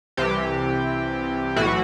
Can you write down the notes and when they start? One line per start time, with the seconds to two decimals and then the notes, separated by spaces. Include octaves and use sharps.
0.17 C2 C3 E3 G4
1.56 B1 A2 E3 F#4